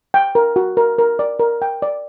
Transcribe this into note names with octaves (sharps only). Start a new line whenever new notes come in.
G5
A#4
F#4
A#4
A#4
D5
A#4
G5
D5